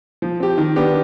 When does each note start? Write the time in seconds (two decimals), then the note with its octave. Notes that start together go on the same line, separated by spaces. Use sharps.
0.22 F3
0.40 C4 G4
0.58 D#3
0.76 B3 D4 G4